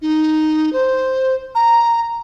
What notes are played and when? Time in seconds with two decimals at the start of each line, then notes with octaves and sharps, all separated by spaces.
0.02 D#4
0.73 C5
1.55 A#5